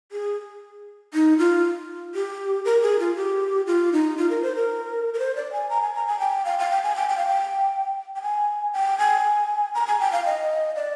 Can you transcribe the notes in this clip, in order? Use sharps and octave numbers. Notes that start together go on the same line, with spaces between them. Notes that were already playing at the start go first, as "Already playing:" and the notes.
G#4
D#4
F4
G4
A#4
G#4
F4
G4
F4
D#4
F4
A#4
C5
A#4
A#4
C5
D5
G#5
A#5
G#5
A#5
G#5
G5
F5
F5
G5
G#5
G5
G5
F5
G5
G5
G#5
G5
G#5
A#5
G#5
G5
F5
D#5
D5